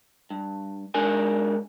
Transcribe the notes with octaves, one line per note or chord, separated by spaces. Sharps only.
G2
G#2 G#3 D4 A#4 G#5